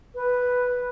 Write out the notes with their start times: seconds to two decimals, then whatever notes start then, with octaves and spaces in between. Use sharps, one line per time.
0.15 B4